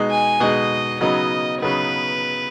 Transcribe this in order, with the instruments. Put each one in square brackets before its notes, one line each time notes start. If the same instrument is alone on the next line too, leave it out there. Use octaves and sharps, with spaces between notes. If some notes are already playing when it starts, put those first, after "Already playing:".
Already playing: [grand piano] B2 G#3 D#4
[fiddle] G#5
[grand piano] B2 G#3 D#4 [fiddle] D#5
[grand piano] C#3 F#3 B3 D#4 [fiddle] D#5
[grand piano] C#3 F#3 B3 D#4 [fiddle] B4